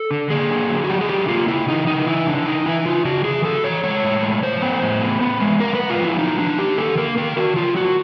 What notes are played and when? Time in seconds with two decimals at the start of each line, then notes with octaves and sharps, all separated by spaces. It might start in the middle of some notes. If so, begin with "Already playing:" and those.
Already playing: A4
0.11 D3
0.30 A#3 G#4
0.50 D3
0.69 F#3
0.84 F#4
0.89 F#3 G4
1.01 G#4
1.09 D3 G4
1.28 A#3 F4
1.48 C#3 E4
1.68 E3 D#4
1.87 C#3 D#4
2.06 E3 E4
2.27 C#3 D4
2.46 E3 D#4
2.66 E3 E4
2.85 C#3 F4
3.05 C#3 F#4
3.24 E3 G#4
3.44 A3 A4
3.64 E3 C#5
3.83 G#3 C#5
4.03 A2
4.23 G#3
4.43 F3 C5
4.62 B3
4.82 A2
5.01 B3
5.21 B3
5.40 G#3
5.60 B3 A#4
5.75 B3 B4
5.90 F4
6.00 F3 E4
6.19 F#3 D#4
6.38 D#3 D4
6.58 A#3 G4
6.78 D#3 A4
6.97 A#3 A#4
7.17 D#3 A#4
7.36 D#3 F#4
7.56 F#3 F4
7.76 D#3 F#4